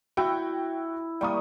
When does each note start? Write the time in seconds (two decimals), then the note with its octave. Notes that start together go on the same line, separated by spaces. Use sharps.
0.17 E4 F#4 G5
1.21 G3 A#3 G5 C#6 D#6